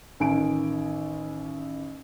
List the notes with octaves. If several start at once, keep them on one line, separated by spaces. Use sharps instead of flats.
A1 D#3 G#5 D7